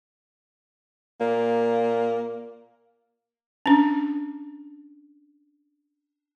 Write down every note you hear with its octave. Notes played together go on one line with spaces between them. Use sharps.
A#2 A#3
C#4 D4